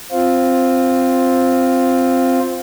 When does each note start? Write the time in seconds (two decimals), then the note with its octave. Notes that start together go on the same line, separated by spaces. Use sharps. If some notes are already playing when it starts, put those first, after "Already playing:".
0.12 C4 F4